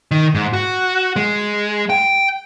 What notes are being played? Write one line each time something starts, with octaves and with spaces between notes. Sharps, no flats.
D#3
G#2
F#4
G#3
G5